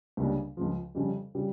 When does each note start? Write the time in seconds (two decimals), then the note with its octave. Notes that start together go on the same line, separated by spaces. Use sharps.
0.17 C#2 C#3 G3 A#3 D4
0.57 C#2 C#3 F3
0.95 F2 C#3 G3 C#4
1.35 C#3 G3